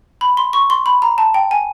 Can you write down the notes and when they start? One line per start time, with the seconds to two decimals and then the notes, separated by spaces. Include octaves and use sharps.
0.21 B5
0.37 C6
0.53 C#6
0.70 C6
0.86 B5
1.02 A#5
1.18 A5
1.34 G5
1.51 G#5